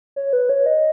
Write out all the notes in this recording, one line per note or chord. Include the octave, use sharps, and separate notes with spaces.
C#5
B4
C#5
D#5